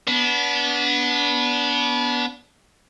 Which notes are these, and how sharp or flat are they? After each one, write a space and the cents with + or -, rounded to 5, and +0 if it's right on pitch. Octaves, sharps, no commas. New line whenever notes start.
B3 -15 D4 -30